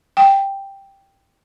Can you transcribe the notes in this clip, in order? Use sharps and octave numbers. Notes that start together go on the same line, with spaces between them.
G5